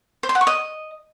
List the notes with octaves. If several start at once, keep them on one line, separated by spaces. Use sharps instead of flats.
C5
C6
F#5
C#6
D#5